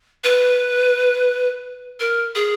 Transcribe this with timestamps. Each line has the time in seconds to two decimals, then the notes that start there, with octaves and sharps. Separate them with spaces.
0.24 B4
2.00 A#4
2.35 G#4